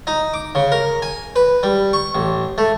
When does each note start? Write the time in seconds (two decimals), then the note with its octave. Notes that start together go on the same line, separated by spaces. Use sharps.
0.07 D#4
0.33 D6
0.55 C#3
0.72 A#4
1.02 G#5
1.36 B4
1.63 G3
1.93 C#6
2.15 A1
2.58 A3